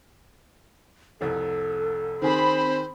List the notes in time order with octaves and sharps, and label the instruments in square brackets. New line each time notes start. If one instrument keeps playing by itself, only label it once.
[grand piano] F1 C2 [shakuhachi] A4
[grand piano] D#3 G#4 [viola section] C4 B5 [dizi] C5